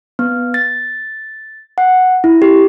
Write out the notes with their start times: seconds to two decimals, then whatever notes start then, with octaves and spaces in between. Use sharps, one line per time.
0.19 B3
0.54 A6
1.78 F#5
2.24 E4
2.42 G4